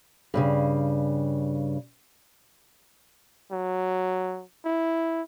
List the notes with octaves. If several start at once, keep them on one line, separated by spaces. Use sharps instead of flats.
G2 A#2 C#3
F#3
E4